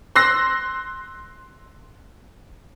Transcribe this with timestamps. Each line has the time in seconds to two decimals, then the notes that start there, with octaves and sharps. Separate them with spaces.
0.16 C6 E6 F#6 A#6 C7